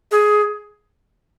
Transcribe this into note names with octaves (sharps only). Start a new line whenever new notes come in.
G#4